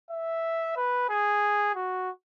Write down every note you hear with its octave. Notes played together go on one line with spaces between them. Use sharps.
E5
B4
G#4
F#4